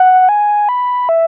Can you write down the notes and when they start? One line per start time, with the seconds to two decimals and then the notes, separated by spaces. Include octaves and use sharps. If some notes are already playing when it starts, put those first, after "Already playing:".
Already playing: F#5
0.29 G#5
0.69 B5
1.09 E5